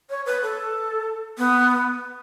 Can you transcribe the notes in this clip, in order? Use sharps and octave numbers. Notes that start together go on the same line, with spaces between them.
C#5
B4
A4
B3